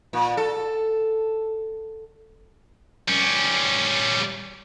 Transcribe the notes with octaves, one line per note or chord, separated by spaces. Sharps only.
A#2
A4
G3 C#4